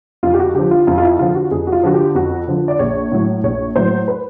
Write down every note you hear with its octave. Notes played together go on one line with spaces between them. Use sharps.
F2 F4
G4
F#4
D3 F3 G4
F4
F2 F4
F4
E4
D3 F3 F4
F#4
F2 G#4
F#4
F4
D3 F3 F#4
G4
F2 F#4
D3 F3
D5
A#1 C#5
A2 F#3
A#1 C#5
A2 F#3 C5
B4